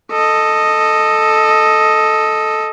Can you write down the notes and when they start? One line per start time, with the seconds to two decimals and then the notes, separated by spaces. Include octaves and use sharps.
0.11 A4 D#5